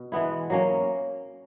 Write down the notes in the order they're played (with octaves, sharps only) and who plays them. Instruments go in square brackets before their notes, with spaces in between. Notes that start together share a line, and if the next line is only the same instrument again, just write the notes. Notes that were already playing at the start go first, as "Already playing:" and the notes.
Already playing: [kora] B2
E3 G#3 B3 E4
F#3 A#3 C#4